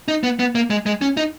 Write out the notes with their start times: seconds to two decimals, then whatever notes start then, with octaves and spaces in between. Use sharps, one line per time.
0.08 D#4
0.23 B3
0.39 B3
0.55 A#3
0.70 G#3
0.86 G#3
1.01 C#4
1.17 D#4